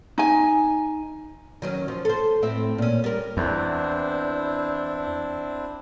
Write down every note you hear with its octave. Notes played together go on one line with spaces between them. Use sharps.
D#4 G#5
D#3 F#3 C#4
F3
A4 C5
A2 C4 E5
A#2 C#4
G3 A#4
E2 C4 D4 E4